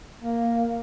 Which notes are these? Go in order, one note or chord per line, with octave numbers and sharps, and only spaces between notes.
A#3